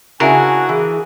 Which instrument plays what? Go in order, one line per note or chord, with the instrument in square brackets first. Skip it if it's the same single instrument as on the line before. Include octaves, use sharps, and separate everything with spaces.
[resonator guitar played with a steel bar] C#3 E4 G#4 [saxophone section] D4 F#4 [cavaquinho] A#4 [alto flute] G#5
[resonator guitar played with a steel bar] E3 [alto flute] G#4